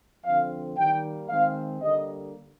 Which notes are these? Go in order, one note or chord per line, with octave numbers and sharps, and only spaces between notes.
D3 F3 C4 F5
D#3 G3 A#3 G5
D#3 G#3 C4 F5
D3 G3 A#3 D#5